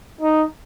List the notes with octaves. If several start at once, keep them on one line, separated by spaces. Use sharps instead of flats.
D#4